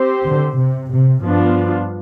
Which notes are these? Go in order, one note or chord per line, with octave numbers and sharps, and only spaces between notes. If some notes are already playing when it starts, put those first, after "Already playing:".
Already playing: C4 G4 C5
D3
C3
C3
G2 F3 B3 D4 F4